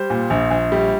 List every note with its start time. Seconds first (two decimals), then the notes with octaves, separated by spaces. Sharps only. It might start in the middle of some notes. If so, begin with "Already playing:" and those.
Already playing: G3 C5
0.10 A#2
0.30 A#1
0.51 A#1
0.72 G3